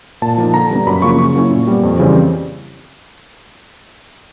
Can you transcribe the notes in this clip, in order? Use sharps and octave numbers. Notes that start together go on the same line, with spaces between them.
A#2 A5
F3 A#3 D#4
D3 A#5
G3 B3 D4
F#2 B5
C#3 F3 A#3 C#4 C#6
C#3 C#6
F#3 A#3 C#4 E4
A#2
G3 B3
F2
C#3 E3 G3 C4